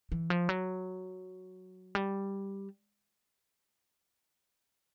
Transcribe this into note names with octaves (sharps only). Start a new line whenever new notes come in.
E3
F3
F#3
G3